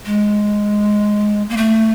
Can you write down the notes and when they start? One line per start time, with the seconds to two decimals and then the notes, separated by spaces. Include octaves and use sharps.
0.05 G#3
1.49 A#3
1.57 A3